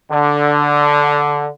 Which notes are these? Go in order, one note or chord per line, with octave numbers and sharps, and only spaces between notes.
D3